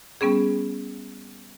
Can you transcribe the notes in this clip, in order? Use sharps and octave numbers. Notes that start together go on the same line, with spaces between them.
G3 B3 C#4 G#4